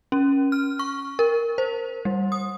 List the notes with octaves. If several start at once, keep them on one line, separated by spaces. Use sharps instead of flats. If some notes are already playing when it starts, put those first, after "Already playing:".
C#4
F6
C#6
A#4
C5
G3
D#6